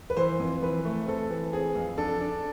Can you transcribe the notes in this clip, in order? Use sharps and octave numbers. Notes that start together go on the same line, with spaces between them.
B4
E3 C5
F2
E3 B4
A3
C4 A4
E3
C4 G#4
F2
D4 A4
D4